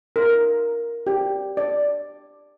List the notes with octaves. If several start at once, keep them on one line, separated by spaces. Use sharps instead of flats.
A#4
G4
D5